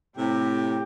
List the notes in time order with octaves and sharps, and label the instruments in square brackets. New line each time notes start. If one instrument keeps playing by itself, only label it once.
[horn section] A2 C3 [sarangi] G4